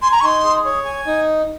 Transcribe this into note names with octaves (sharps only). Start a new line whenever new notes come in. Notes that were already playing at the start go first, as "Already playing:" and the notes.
G#5 C6
A#5
C#6
D#4 C6
G#4
C#5
G#5
D#4